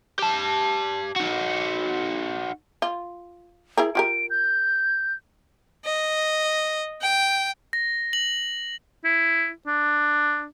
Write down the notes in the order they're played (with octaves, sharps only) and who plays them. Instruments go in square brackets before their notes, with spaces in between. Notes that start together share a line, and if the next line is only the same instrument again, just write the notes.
[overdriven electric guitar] G4 A5
D#4 F#4
[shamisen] F4
E4 G#4 A#4
[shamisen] F4 G4 A#4 [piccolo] D7
[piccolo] G6
[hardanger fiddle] D#5
G5
[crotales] A#6
F#7
[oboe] E4
D4